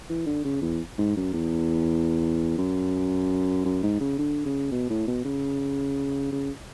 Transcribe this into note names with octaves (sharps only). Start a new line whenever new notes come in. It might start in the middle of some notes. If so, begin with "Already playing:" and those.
E3
D3
C#3
E2
G#2
F#2
E2
F#2
F#2
G#2
C#3
D3
C#3
B2
A2
B2
C#3
C#3